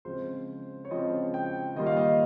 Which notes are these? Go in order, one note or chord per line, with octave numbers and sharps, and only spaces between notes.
C#3 F3 G#3 C4 F4 C5
C#5
C#3 F3 G#3 C4 F4 D#5
G5
D#3 G3 A#3 F4 D#5
F5
D#5